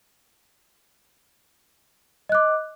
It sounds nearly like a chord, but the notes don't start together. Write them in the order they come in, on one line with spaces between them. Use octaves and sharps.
D#5 F#6 D6